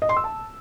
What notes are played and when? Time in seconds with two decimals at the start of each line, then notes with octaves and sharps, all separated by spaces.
0.02 D#5
0.09 C6
0.17 E6
0.24 A5